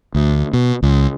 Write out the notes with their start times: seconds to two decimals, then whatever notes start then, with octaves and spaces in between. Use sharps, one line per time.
0.15 D2
0.53 B2
0.83 C#2